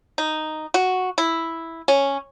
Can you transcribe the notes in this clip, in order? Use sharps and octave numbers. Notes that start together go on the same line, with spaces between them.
D#4
F#4
E4
C#4